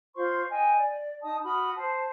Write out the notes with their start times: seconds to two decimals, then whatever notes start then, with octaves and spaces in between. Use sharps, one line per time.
0.15 F4 C5 C6 C#6
0.50 D#5 G5 G#5
0.77 D5
1.22 D#4 D#5 A5 D#6
1.44 F#4 B5 D#6 F6
1.76 C5 A5